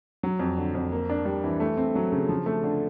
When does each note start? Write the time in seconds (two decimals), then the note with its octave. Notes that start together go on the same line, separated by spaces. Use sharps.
0.23 F#3
0.39 F2
0.57 D3
0.75 F2
0.92 A#3
1.10 D4
1.26 G3
1.44 E3
1.60 A3
1.77 C4
1.95 F#3
2.12 C#3
2.29 F3
2.46 A3
2.63 D3